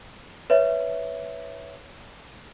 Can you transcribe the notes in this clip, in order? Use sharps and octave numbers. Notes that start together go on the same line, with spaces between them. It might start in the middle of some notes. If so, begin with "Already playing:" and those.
B4 C#5 E5